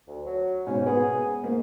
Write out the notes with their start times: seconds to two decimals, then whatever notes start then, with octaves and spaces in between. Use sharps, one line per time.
0.07 D2
0.26 F#3
0.67 G#2 B2 C#4
0.86 B3 G#4
1.44 G#2 A#3